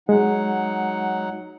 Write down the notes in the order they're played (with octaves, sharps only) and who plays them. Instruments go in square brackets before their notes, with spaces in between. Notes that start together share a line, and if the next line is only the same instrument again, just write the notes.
[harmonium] F#3 D#4 F#5 [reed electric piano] G#3